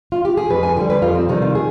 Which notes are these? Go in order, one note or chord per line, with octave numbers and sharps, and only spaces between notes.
F4
G4
G#4
F2 B4
G#5
D3 G3 G5
B4
F2 F4
C4
C3 D#3 G3 D#4
F4
G#4